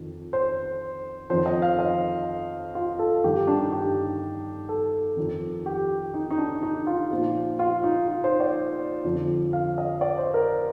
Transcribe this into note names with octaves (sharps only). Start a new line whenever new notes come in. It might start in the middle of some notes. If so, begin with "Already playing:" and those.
Already playing: F2 D#3
C5
F2 D#3 C5
D#5
F5
D#5
F4
A4
G2 D#3 G4
D4
D#4
G4
A4
F2 D#3
G4
D#4
D#4
D4
D#4
F4
A#2 F3
F4
D#4
F4
C5
D5
F2 D3 F3
F5
D#5
D5
C5
A#4